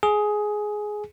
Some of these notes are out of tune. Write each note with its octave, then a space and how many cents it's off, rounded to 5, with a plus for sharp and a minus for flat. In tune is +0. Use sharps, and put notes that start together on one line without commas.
G#4 +10